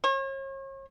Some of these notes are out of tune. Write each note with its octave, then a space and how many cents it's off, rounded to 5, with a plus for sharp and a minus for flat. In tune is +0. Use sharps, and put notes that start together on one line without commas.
C#5 -40